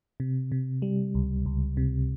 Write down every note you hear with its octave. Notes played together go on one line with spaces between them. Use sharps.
C3
C3
G3
C#2
C#2
C3